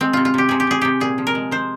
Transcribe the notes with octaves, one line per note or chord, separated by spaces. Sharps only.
G#3 C4
C3 F4
F4
C3 G4
C3 G#4
G4
C3 G#4
C3 G4
A#2 G#4
F3
A#4
G#3
G#3 C5